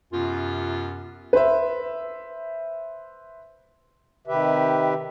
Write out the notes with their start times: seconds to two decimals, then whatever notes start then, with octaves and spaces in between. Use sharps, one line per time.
0.13 F#2 C3 B3 F4
1.33 B4 C5 E5
4.27 C3 D#3 G4 B4 E5